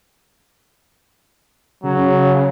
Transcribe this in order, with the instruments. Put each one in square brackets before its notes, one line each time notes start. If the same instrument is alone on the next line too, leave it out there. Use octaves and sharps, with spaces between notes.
[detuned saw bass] C#3 [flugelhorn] F#3